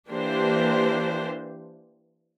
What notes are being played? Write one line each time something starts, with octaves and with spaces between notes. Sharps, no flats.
E3 A#3 D4 G4 C5